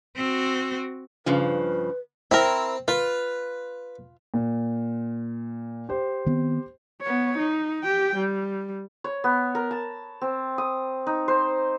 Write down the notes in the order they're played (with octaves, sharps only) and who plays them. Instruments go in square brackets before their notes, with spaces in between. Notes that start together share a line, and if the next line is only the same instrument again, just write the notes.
[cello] C4 F#4
[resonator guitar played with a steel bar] G2 C#3 F3 [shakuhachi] B4
[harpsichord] C4 [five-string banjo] E4 A#4
[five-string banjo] F4 [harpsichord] B4
[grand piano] A#2
G4 C5
[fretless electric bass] D#3 B3 C4
[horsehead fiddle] B3 C#5
D#4
G4 G5
G3
[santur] C#5
B3
A#4
A5
C4
D#6
D#4
C5